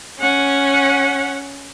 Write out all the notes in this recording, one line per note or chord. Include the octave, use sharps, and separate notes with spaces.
C#4 F#5